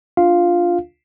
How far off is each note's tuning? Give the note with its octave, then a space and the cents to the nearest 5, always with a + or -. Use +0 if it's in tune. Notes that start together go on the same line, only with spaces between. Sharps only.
D4 +0 F4 +0 F5 +0